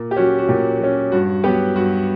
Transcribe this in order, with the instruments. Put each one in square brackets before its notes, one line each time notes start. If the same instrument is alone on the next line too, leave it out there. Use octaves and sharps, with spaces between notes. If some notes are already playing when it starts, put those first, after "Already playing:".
Already playing: [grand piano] A#2
G4
F#3 C#4 F#4
F#4
A#2 G4
F#3 C#4
G2 F#4
F#3 B3 G4
G2 F#4